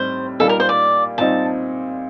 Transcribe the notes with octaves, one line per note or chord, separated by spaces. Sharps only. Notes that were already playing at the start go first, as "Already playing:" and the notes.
Already playing: A2 G3 C4 D#4 C5
A#2 G3 A#3 D#4 A4
A#4
C5
D5
A#2 G3 C4 D#4 A5